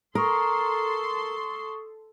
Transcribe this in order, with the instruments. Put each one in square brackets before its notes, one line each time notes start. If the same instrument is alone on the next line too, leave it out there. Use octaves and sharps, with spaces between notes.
[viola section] A4 C6 [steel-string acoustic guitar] A#4 [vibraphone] C#6 D#6